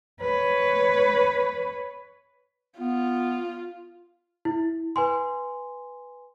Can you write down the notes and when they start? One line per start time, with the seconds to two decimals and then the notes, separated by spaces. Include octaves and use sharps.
0.21 B4 C#5
2.79 B3 F4
4.45 E4
4.96 B4 G#5 C6